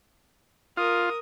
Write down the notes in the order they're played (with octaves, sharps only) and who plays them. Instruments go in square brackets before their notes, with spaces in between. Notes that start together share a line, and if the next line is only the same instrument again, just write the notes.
[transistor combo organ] F4 [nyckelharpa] A#4 D#6